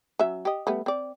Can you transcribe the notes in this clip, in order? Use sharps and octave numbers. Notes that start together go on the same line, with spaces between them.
F#3 C#4 E5
G4 D#5
G3 A3 B3
C4 D5